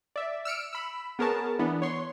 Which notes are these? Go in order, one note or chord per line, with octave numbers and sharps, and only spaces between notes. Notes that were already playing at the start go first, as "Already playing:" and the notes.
D5 E5
E6 F6 C#7 D7
B5 E6
B3 G#4 A#4 B4 C#5 A5
E3 B3 D4
C#5 C6 C#6